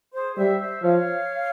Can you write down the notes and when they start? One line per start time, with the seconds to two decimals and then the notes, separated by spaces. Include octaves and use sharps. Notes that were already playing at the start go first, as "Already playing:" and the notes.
0.14 G#4 C5
0.36 G3 C5 E5
0.60 C5 E5
0.83 F3 C#5 F5